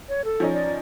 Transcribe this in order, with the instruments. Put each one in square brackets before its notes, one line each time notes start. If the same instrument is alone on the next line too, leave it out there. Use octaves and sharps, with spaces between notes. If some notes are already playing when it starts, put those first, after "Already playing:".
[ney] C#5
A4
[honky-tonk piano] F3 C#4 D#4
[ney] D5